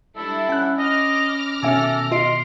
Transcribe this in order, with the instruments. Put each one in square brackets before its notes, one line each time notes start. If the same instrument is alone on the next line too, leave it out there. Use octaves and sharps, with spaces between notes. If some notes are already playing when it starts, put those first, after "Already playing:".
[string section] G3 D4 E4 [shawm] A4
[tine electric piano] C#4 B5 [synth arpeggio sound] F#5 F#6
[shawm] D#5 [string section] D6 F6 A#6
[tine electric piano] B2 D#3 B3 [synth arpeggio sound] C#4 E5 G#5 [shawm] A4
[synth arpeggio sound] F4 D#5 D7 [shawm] C6